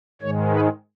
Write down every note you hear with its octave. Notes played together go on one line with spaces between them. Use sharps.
G#2 D#3 G#3 C#5
B4